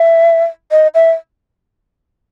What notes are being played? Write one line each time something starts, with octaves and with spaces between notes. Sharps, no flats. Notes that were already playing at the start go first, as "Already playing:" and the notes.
Already playing: E5
D#5
E5